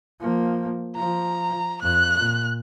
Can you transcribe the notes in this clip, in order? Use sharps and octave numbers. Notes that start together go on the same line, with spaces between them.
F3 A#3
F3 A#5
F2 F#6
A#2